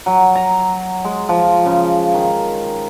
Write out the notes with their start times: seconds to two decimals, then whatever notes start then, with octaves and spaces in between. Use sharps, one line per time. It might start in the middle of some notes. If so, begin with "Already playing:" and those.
0.06 F#3
0.35 A#5
1.05 G#3
1.29 F3
1.66 C#3
2.14 D#3